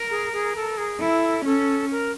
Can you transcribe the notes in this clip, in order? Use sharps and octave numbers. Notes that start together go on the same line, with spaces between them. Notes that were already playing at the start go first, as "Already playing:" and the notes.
Already playing: A#4
G#4
G#4
A4
G#4
E4 A4
C#4 A4
A#4